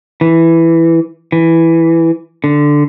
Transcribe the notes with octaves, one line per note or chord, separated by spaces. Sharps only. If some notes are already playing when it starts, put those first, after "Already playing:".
E3
E3
D3